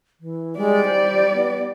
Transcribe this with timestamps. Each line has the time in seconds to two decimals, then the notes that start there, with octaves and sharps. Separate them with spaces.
0.20 E3
0.57 G3 G#3 D5
0.86 C5
1.34 B3